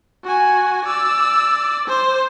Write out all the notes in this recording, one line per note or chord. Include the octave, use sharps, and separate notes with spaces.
F#4 G#5
D5 E6
C5